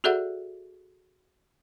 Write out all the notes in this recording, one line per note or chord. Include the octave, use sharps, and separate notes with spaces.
F#4 G#4 A4 D5 E5 F#5